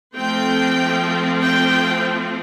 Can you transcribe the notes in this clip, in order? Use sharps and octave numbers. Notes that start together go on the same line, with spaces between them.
F3 A3 C4 G5
G5